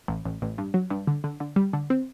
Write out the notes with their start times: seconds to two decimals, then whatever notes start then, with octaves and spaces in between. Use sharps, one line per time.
0.08 A1
0.26 A1
0.42 A1
0.58 G2
0.74 F#3
0.90 G2
1.07 D3
1.24 D3
1.40 D3
1.56 G3
1.73 D3
1.90 C4